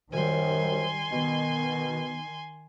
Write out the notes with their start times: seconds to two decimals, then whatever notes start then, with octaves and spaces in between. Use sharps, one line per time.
0.12 F#2 D#3 G3 C5 G#5 C6
1.12 B2 D#3 B3